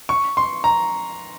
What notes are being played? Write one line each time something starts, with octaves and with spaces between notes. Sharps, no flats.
C#6
C6
A#5